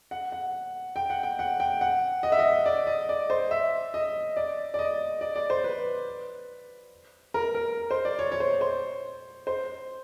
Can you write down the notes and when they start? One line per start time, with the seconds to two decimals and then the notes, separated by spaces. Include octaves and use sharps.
0.11 F#5
0.32 F#5
0.96 G5
1.10 F#5
1.23 G5
1.39 F#5
1.60 G5
1.81 F#5
2.23 D#5
2.32 E5
2.39 D#5
2.66 D5
2.87 D#5
3.09 D5
3.30 C5
3.51 E5
3.94 D#5
4.37 D5
4.74 D5
4.79 D#5
5.21 D5
5.36 D5
5.50 C5
5.64 B4
7.34 A#4
7.55 A#4
7.91 C5
8.05 D5
8.19 C#5
8.32 C#5
8.40 C5
8.61 C5
9.47 C5